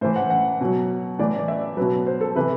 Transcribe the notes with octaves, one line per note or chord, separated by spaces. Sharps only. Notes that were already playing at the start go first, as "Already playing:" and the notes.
A2 E3 C5
F#5
F#5
B2 F#3
A2 E3 D5
D5
E5
B2 F#3 B4
C5
A4
C3 E3 B4